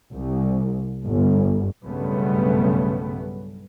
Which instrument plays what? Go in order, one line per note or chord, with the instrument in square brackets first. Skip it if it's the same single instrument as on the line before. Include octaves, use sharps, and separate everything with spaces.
[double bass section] C2
G1
B1 G2 C#3 G3 A3 B3